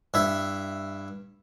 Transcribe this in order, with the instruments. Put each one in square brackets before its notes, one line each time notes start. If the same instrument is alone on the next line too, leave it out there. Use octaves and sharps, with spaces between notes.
[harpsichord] G2 E4 E5